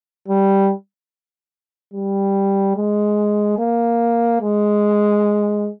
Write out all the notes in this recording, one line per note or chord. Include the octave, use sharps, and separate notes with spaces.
G3
G3
G#3
A#3
G#3